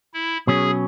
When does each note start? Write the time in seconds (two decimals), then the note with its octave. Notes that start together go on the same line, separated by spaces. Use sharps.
0.14 E4
0.47 B2 F#3 C#4 G#4